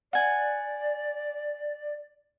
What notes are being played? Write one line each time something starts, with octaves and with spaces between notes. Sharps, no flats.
D5 F#5 G#5